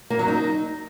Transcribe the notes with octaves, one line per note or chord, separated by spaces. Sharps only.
A#3
F#3
D#4